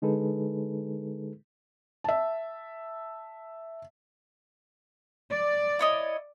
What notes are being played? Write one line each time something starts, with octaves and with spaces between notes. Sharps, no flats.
D3 G#3 D#4 G#4 A4 B4
E5 A5
D5
E4 C#5 D#5